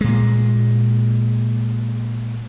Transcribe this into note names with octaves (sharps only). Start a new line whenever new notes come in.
A#2 G#3